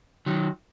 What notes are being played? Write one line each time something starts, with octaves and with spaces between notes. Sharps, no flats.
D#3 F#3